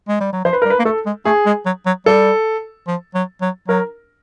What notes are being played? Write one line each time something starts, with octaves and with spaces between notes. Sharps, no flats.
G#3
G3
F#3
F3 C5
B4
G3 A#4
B4
A#3
A3 A4
G#3
A3 G#4
G#3
F#3
F#3
G3 A4
F3
F#3
F#3
F#3 A#4